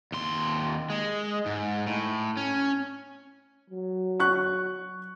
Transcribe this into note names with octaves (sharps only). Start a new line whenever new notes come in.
D#2 C6
G#3
G#2
A2
C#4
F#3
C#6 F#6